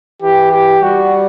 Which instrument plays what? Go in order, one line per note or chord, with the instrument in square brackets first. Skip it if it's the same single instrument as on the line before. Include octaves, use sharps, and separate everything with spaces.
[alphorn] E3 [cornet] G4
[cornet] G4
[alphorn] G3 [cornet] F#4